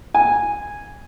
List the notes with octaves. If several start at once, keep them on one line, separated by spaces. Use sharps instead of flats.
G#5